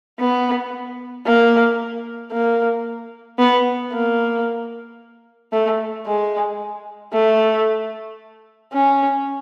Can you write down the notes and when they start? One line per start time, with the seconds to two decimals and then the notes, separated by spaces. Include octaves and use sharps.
0.20 B3
1.26 A#3
2.32 A#3
3.39 B3
3.92 A#3
5.52 A3
6.06 G#3
7.13 A3
8.73 C#4